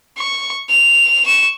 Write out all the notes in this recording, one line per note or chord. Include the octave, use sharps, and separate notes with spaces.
C#6
F7
C#6 E7